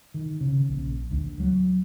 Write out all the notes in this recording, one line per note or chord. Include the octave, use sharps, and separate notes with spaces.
D#3
C#3
A#1
D2
F#3